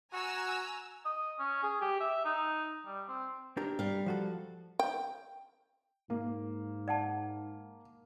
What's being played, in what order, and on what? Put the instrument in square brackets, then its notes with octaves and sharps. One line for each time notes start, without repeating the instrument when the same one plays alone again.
[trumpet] F#4 [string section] G#5 A#5 E6
[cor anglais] D#5
C#4
G#4
G4
E5
D#4
G3
C4
[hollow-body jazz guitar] D4 G4 A#4
[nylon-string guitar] G3 F5
[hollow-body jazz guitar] F3 F#4 A4
[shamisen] G5
[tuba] G#2 [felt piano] A#3
[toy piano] D5 F#5 A5